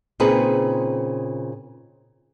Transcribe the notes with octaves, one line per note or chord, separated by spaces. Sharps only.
A#2 C#3 C4 D#4 G#4 B4